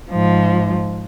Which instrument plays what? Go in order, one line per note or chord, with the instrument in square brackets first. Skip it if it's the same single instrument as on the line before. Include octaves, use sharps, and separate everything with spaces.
[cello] G#2 F3